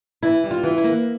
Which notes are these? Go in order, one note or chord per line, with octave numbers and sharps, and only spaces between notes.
E3 E4
G3
F4
E3
E4
A#3